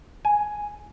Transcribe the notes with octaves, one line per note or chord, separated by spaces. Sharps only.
G#5